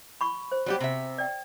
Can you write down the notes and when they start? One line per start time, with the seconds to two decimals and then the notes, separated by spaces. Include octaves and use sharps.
0.21 B5 C#6
0.52 C5
0.66 F#3 G3 G4
0.80 C3 E5
1.18 D5 G5